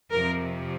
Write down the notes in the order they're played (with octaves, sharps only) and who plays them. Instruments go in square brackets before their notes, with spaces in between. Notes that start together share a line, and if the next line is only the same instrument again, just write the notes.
[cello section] F2 C3 F3 A#4